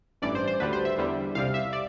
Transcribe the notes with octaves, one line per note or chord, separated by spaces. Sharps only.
A1 G2 E3 D5
C5
C5
D2 D3 G3 B4
C5
E5
E2 D3 G3
C2 C3 G3 F5
E5
D5